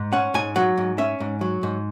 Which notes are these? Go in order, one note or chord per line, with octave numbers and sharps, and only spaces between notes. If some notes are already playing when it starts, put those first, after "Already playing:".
Already playing: G#2
C#4 F#5
G#2 G#5
F#3 F#5
G#2
C#4 E5
G#2
F#3
G#2